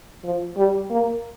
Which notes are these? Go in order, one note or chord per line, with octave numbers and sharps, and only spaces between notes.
F3
G3
A#3